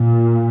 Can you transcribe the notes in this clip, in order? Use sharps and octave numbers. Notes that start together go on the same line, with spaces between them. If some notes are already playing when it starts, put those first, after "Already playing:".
Already playing: A#2